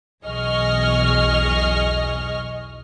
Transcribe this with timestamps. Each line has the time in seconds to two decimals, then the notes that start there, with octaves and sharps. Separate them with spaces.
0.24 B1 E2 G#4 D#5 C#6 F6